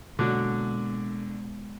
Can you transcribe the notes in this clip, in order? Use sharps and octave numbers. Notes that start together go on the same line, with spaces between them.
B2 D3 F#3 G#3 A#3 D4